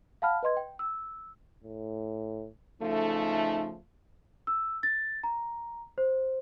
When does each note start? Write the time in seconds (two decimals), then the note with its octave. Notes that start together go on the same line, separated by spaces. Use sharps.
0.22 F5 F#5 A5 B5 F6
0.43 B4 D#5 C6 G#6
0.57 G5
0.79 E6
1.64 A2
2.82 C#3 F3 A3 D#4
4.47 E6
4.83 A6
5.23 A#5
5.98 C5